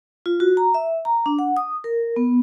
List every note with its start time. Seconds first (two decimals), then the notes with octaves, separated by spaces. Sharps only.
0.26 F4
0.40 F#4
0.57 A#5
0.74 E5
1.05 A#5
1.26 D4
1.39 F#5
1.57 D#6
1.84 A#4
2.16 B3